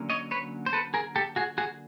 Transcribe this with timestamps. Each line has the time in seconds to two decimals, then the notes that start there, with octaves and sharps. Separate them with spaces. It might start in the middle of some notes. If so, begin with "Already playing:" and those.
Already playing: D3 F#3 A#3 C#4
0.10 C#5 D#5
0.31 B4 C#5
0.66 C5
0.73 A4 B4
0.94 G#4 A#4
1.16 G4 A4
1.36 F#4 G#4
1.58 F#4 G#4